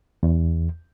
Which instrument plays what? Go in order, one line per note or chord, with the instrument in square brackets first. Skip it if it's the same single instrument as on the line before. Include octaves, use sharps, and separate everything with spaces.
[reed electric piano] E2